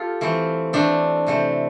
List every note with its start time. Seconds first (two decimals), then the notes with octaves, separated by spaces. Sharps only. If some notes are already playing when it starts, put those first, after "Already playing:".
Already playing: F4 G4 A4
0.21 E3 A3 C4
0.73 E3 A3 C4 D4
1.27 C3 E3 A3 C4